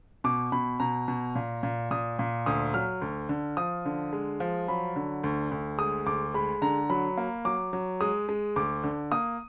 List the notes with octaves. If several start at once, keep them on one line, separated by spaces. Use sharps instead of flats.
B2 D6
B2 B5
B2 A#5
B2
A#2
A#2
A#2 D#6
A#2
D2 D#6
F#3 F6
D2
D3
F3 D#6
D3
G#3
F3
F#3 B5
D3
D2
D2
G#3 D#6
D2 D6
G#3 B5
D3 A#5
F#3 B5
A#3
F#3 D6
F#3
G#3 D#6
G#3
D2 D6
D3
A#3 D#6